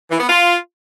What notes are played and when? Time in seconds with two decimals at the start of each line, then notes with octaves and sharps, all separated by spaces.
0.11 E3
0.20 B3
0.28 F4